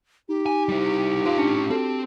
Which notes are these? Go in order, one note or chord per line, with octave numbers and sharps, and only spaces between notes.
D#4 G4
G#5
G3 E4
F4 B4 F5
A2 C#4 D4
C4 F#4 A4 A5